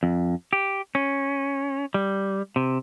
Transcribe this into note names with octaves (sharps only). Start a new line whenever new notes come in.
F2
G4
C#4
G3
C3